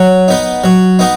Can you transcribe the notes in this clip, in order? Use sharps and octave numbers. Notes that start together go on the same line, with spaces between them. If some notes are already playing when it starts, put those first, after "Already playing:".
Already playing: F#3
B3 D#4
F#3
B3 D#4